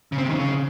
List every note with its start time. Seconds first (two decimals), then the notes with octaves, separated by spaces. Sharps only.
0.12 C#3
0.18 C4
0.24 C3
0.29 D#3
0.35 C#3